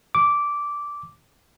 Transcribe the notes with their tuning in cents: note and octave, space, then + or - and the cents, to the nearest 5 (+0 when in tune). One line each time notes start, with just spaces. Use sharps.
D6 -10